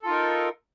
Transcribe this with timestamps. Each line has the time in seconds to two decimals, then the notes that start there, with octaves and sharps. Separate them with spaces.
0.03 A4
0.05 F4
0.08 D#4
0.11 A#4